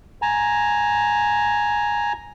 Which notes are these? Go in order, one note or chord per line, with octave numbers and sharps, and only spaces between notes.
G#5 A#5